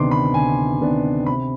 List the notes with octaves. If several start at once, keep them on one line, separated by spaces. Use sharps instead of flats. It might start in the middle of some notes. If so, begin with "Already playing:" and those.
Already playing: D2 C3 D#3 B3 D4 C6 D6
B5
D2 G#5
C3 D#3 B3 D4
C3 B5